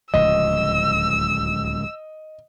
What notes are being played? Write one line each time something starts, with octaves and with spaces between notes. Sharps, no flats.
D1 C#2 F3 D#5 E6